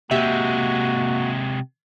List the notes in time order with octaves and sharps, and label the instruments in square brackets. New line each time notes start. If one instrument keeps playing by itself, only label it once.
[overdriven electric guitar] C3 G#3 [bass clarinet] A#3 [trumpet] F#4 [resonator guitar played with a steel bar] G4 E5